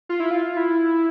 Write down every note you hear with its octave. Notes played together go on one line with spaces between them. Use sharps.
F4
E4
F4
E4